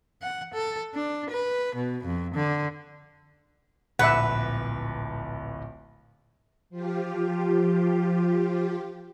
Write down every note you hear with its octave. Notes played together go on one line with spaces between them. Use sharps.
F#5
A4
D4
B4
B2
F2
D3
D1 A#1 B4 E5 F#5 D6
F3 F4 G4